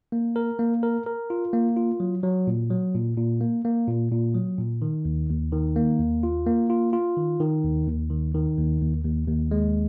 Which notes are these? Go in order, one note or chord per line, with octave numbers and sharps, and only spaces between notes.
A#3
A#4
A#3
A#4
A#4
F4
A#3
F4
F#3
F#3
A#2
F#3
A#2
A#2
A#3
A#3
A#2
A#2
F#3
A#2
D#3
D#2
D#2
D#3
A#3
D#2
F4
A#3
F4
F4
D#3
D#3
D#2
D#2
D#3
D#3
D#2
D#2
D#2
D#2
G#3